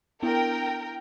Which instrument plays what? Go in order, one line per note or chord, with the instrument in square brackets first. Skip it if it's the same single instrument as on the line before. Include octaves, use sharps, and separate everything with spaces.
[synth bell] B3 D4 E4 [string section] A#4 G5